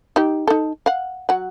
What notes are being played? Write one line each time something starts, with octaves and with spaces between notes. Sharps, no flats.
D#4 G4
D#4 A4
F5 F#5
F#3 F#5